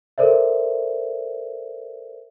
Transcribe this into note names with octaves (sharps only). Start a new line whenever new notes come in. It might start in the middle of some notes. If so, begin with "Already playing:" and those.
A4 A#4 C5 D5 E5